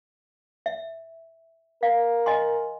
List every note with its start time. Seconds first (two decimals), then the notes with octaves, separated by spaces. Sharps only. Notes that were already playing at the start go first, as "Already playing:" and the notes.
0.66 E5
1.83 A#4 F5
2.26 D#5 G#5 C6